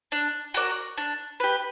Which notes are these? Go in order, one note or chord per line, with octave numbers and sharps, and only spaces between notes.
D4
F#4 A#4 D5
D4
G4 B4